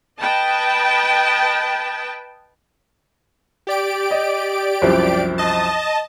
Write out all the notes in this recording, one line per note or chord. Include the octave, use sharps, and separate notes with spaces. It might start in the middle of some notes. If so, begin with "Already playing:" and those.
B4 D#5 G5 A5
G4 D5 D7
D#5
C2 F#2 F3
D#5 A5